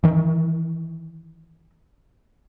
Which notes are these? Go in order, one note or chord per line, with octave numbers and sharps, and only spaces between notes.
D#3 E3